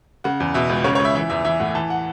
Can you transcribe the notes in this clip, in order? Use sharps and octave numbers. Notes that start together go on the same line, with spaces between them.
C#3 F#5
E2
B2 E5
C#2
C#3 C#5
C#5
C#2
E5
E3 E5
E2 E5
E3 E5
A2 F#5
E3 A5
F#5